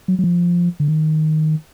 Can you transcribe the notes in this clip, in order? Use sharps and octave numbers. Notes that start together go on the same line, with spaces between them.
F#3
F#3
F3
D3
D#3